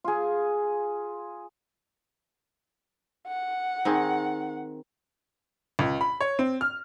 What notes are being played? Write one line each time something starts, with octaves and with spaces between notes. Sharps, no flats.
F4 G#4
F#5
D#3 C4 G#4
C#2
B5
C#5
C4
F6